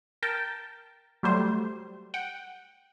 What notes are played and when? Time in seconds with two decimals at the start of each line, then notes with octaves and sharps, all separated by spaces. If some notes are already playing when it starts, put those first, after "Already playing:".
0.23 A#4 G5 A5
1.23 F#3 G3 A3 C5
2.14 F#5 G5